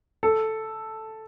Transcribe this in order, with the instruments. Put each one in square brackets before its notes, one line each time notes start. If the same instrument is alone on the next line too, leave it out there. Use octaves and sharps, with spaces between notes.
[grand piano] A4